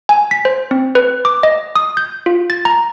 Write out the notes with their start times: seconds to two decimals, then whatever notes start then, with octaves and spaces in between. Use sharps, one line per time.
0.09 G#5
0.31 B6
0.45 C5
0.71 C4
0.95 B4
1.25 D6
1.43 D#5
1.76 D#6
1.97 G6
2.26 F4
2.50 A6
2.65 A#5